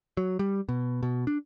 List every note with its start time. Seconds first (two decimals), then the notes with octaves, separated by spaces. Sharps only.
0.17 F#3
0.39 G3
0.69 B2
1.03 B2
1.27 D4